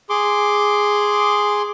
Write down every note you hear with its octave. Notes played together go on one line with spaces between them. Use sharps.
G#4 C6 D6